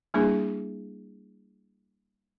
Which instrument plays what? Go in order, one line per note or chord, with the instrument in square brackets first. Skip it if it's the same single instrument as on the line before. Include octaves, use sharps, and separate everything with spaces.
[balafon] G3 A#3 D4 E4 G#4